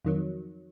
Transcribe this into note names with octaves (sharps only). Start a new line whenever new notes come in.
F2 D#3 F#3